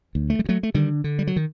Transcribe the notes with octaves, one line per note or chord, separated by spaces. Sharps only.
D2
A3
G3
D2
F#3 A3
A3
D3 D#3 G3
D3
G3
F#3
D#3